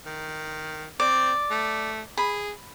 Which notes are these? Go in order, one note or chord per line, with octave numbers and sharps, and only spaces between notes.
D#3
C4 D5
A3
G#4 B5